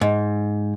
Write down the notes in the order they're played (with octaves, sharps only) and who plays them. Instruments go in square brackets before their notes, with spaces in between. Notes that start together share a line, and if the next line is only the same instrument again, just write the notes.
[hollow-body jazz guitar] G#2